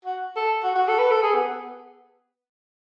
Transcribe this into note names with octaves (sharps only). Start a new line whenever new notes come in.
F#4
A4
F#4
F#4
A4
B4
A4
G#4
B3